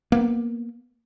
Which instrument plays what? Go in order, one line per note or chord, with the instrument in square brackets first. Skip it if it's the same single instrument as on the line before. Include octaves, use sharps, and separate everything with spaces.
[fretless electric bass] A#3 B3